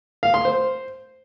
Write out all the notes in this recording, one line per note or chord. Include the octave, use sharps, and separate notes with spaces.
F5
C6
C5